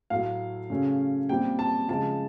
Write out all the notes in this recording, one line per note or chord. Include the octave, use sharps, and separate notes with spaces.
A2 F#3 A3 F5
C#3 F#3 A3 C#4
A#2 G3 C4 G5
A5
C#3 F3 G#3 A5